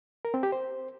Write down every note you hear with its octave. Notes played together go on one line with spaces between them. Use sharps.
A#4
C4
G4
C5